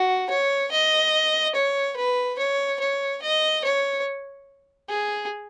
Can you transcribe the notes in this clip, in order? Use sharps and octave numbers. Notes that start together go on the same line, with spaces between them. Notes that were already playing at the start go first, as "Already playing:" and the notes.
Already playing: F#4
C#5
D#5
C#5
B4
C#5
C#5
D#5
C#5
G#4